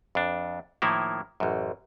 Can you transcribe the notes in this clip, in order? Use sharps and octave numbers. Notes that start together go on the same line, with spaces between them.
F2 D4
A2 D#3 F3 A#3 E4
A1 F#2